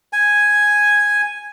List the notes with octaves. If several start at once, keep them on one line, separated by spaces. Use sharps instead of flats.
G#5